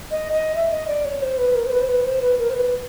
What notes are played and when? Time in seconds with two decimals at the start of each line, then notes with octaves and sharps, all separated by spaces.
0.11 D#5
0.32 D#5
0.55 E5
0.72 D#5
0.88 D5
1.05 C#5
1.22 C5
1.38 B4
1.55 A#4
1.66 C5
1.72 B4
1.81 C5
1.88 B4
2.04 C5
2.22 B4
2.39 A#4
2.49 C5
2.55 B4